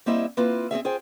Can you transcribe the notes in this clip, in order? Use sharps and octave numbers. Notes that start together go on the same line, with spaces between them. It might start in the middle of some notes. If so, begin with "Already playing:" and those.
G3 A#3 C4 E4 D#5 E5
A#3 C4 E4 F4 B4
C4 C#4 G#4 E5
F4 G#4 C5 G5